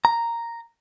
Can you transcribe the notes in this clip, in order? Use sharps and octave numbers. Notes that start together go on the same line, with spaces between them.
A#5